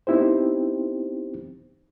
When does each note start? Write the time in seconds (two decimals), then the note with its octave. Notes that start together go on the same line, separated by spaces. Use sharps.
0.07 B3 C4 D#4 E4 G4 C5